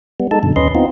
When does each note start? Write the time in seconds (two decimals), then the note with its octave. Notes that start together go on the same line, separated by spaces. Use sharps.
0.20 G3 B3
0.31 G#3 D#4 A4 A5
0.43 F#2 B2 D3
0.56 D#2 C#4 B4 D#5 C6
0.75 B3 C4 D#4 F4